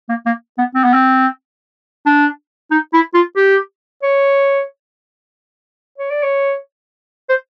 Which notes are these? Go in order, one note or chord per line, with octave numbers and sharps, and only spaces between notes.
A#3
A#3
B3
C4
B3
C4
D4
D#4
E4
F4
G4
C#5
C#5
D5
C#5
C5